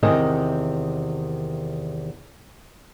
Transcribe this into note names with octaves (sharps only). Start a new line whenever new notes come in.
E2 C3 D#3 D#5 G#5